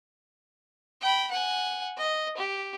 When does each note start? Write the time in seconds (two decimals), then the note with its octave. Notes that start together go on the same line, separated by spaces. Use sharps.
1.01 G5 B5
1.31 F#5 G#5
1.97 D#5
2.37 G4